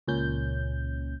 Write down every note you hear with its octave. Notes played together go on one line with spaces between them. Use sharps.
C#2 A#2 C#4 G6